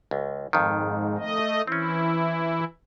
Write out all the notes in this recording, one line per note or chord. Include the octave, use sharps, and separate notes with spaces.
C#2
F2 G#2 D#3
A3 D#5
E3 C4 C#4 E4